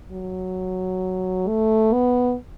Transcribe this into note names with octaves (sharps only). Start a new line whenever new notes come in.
F#3
A3
B3